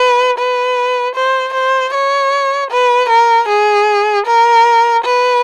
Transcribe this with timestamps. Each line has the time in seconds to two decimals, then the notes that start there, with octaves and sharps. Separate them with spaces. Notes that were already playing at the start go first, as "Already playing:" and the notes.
Already playing: B4
0.38 B4
1.15 C5
1.54 C5
1.93 C#5
2.71 B4
3.09 A#4
3.49 G#4
4.27 A#4
5.04 B4